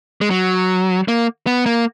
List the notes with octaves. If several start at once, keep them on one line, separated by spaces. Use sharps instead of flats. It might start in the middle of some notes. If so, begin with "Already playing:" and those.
G#3
F#3
A#3
B3
A#3